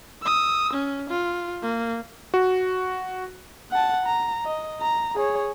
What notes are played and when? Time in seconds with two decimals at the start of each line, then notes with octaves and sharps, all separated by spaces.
0.22 D#6 E6
0.73 C#4
1.10 F4
1.63 A#3
2.34 F#4
3.71 F#5 A5
4.06 A#5
4.46 D#5
4.82 A#5
5.16 G#4 C#5